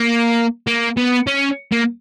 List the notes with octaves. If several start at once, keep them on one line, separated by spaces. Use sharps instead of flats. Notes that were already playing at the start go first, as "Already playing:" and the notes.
Already playing: A#3
A#3
B3
C#4
A#3